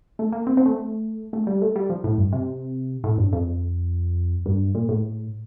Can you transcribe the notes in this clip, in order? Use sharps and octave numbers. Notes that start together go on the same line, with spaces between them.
A3
A#3
C4
C4
A3
A3
G3
A3
G3
F3
A2
G2
C3
A2
G2
F2
G2
A#2
A2